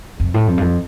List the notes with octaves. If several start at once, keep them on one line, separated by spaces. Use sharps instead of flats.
F2
A2
F2
G2
F2